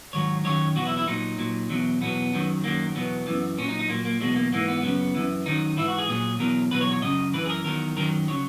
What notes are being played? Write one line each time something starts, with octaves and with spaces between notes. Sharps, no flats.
G#2 D#3 F#3 C#5
F#2 D#3 F#3 C#5
E2 B2 F#3 F#4
E4
E4
A#2 F#3 D#4
A#2 F#3
E2 B2 F#3
E2 B2 F#3 B3
F#2 D#3 F#3
F#2 D#3 F#3 A#3
E2 B2 F#3 B3
F#2 E3
A#2 F#3 C#4
D#4
D#4
A#2 F#3 A#3
A#3
E2 B2 F#3 G#3
A#3
G#2 E3 A#3
B3
F#2 C#3 F#3
F#2 E3
F#2 D#3 F#3 D#4
G#2 E3 E4
F#4
G#4
A#2 F#3 G#4
E2 B2 F#3 A#4
E2 B2 F#3 B4
C#5
C#5
F#2 C#3 F#3 D#5
F#2 C#3 E3 B4
G#4
A#4
E2 D#3 F#3 A#4
F#2 D#3 F#3 A#4
C#3 F#3 C#5